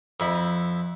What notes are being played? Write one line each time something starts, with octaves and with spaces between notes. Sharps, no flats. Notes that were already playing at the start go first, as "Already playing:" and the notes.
F2 E4 B5